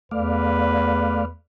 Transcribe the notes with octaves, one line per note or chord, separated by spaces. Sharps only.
E2 A3 B4 D5 F5